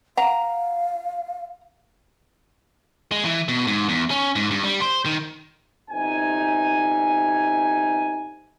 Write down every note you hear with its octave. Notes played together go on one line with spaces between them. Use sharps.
F5 F#5 A#5
G#3
E3
B2
G#2
E2
C#4
G#2
G2
G3
C5
D#3
G1 C3 D#4 G#5